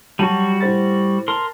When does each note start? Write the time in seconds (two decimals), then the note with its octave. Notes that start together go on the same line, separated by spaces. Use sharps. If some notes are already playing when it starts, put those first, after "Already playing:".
0.19 F#3 G3 F#4 A5 D#7
0.60 A2 C5 A6
1.28 A#4 A5 C6